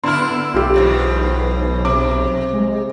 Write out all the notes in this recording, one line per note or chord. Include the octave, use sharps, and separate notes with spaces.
D3 B3 D4 E4 C6 F6
B1 F4 G4
E2 G#2 B2
C3 D6
G#3